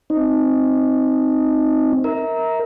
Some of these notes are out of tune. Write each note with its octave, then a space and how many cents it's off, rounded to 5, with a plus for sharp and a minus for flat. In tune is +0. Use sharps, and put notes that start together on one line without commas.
C4 +0 D#4 +0
A#4 +5 E5 -35